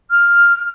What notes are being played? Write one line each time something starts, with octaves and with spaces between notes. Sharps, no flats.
F6